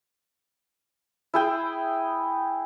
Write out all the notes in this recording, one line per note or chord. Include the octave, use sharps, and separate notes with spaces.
E4 G#4 G5